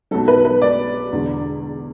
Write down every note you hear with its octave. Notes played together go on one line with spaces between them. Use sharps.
B1 B2 F#3 A4
B4
B4
D5
E1 E2 D3